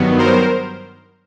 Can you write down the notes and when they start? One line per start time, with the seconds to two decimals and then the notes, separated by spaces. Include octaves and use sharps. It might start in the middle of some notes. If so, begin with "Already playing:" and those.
Already playing: G2 D#3 F#3 B3
0.18 A#4 C5